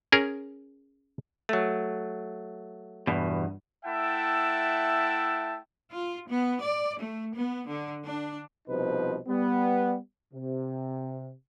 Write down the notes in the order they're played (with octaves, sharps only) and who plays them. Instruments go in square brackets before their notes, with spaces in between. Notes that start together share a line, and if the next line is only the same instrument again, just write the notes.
[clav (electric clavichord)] C#4 G#4 A#4
F#3 A3
[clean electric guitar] E2 B2 [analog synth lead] G2
[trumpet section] A3 E4 E5 F#5 G5 A5
[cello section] F4
B3
D5
A3
B3
D3
D4
[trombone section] C2 B2 F3 D#4 B4 C5
G3 B3
C3